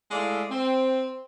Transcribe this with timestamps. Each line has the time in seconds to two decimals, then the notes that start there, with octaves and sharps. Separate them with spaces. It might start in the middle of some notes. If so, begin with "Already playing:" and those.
0.11 G#3 A3 E4 D5 E5 F5
0.51 C4